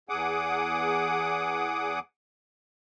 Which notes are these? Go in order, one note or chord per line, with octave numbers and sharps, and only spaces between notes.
E2 G#4 F#5 D6 D#6